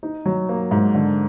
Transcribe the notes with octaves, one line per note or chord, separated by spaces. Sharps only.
D#4
F#3
A#3
G#2
D3